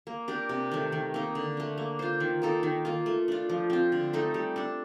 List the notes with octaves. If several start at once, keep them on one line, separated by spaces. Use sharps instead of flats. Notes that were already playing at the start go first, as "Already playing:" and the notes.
A#3
D4 G4 A#4
C3
D#3 A3
D#3
A#3 D#4
D3
A3 D4
A#3
F4 C5
D#3
A#3 D#4 A4
D#3
A#3 F4
A3
D4 F4
F3
C4 F4
D3
A3 D#4 A4
G3
D4 A4